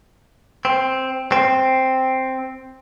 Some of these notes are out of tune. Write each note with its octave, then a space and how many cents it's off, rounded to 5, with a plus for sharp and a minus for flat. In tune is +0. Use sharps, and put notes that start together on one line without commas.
C4 +5
C4 +0